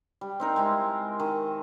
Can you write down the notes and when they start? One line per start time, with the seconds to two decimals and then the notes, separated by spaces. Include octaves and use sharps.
0.21 G3
0.40 C4 D#4 A#4
0.56 G#3 C4 E4
1.20 D#3